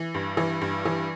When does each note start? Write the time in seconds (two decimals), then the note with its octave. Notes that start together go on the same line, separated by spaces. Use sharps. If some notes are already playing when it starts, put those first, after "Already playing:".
Already playing: E3
0.14 G2
0.37 E3
0.61 G2
0.85 E3